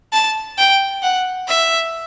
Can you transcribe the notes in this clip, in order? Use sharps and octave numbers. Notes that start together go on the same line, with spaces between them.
A5
G5
F#5
E5